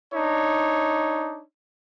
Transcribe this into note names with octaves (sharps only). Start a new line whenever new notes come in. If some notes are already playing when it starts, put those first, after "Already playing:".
D4 D#4 C#5